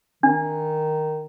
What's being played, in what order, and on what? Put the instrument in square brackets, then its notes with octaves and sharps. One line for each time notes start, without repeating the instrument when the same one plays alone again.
[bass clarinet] D#3 [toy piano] D4